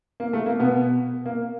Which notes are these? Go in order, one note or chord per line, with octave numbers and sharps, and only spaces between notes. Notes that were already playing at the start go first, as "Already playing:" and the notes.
A#3
A3
A#3
B2 B3
A#3